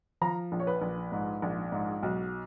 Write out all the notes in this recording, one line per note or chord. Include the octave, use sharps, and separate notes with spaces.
F3 A#5
A#1
C#5
B4
A#1
G#2
A#1
G#2
B1